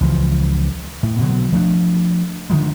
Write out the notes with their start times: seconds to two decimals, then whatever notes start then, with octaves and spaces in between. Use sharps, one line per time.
0.01 C#2 E3 F3
1.03 A2
1.19 B2 D3 F#3
1.52 F3 A3 C#4 D4
2.50 D3 D#3 F3 G#3